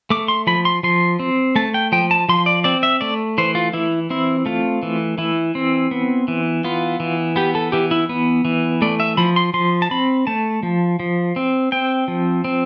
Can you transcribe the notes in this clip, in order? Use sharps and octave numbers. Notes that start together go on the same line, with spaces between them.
A3 D6
C6
F3 B5
C6
F3 C6
C4
A3 A5
G5
F3 G5
A5
F3 C6
D5
C4 D5
E5
A3 D5
E3 C5
F4
E3 E4
C4 E4
A3 F4
E3
E3 E4
C4
B3
E3
B3 F4
E3
B3 G4
A4
E3 G4
E4
B3
E3
A3 D5
E5
F3 B5
C6
F3 C6
A5
C4 B5
A3 A5
F3
F3
C4
C4 G5
F3
C4